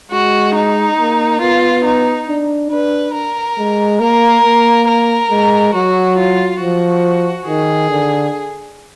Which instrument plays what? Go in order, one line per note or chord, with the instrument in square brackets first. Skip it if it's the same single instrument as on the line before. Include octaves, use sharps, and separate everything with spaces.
[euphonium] G#3 [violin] F#4
[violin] D#4
[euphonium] A#3
[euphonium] B3 [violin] F4
[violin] D#4
[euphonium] D4
[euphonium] D4 [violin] B4
[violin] A#4
[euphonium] G#3
[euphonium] A#3 [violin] A#4
[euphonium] A#3
[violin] A#4
[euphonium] G#3
[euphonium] F#3 [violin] F#4
[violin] F4
[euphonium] F3 [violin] F#4
[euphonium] D#3 [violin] G#4
[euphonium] D3